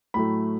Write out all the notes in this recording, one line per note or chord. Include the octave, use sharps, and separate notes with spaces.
A2 F#3 A3 B5